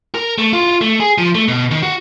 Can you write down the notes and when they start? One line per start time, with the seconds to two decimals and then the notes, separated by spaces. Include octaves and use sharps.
0.15 A#4
0.38 A3
0.53 F4
0.81 A3
1.00 G#4
1.18 F3
1.35 A3
1.48 B2
1.71 D#3
1.83 F#4